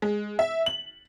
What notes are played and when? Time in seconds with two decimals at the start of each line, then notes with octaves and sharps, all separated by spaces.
0.02 G#3
0.39 E5
0.66 F#7